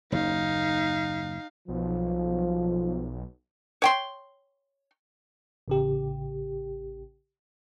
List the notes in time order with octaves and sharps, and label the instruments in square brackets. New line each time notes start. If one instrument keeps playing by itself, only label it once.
[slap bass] F#1 D#2 [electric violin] D#4 F5
[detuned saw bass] B1 [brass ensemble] F3
[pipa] C#5 G5 C6
[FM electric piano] A1 C#3 G4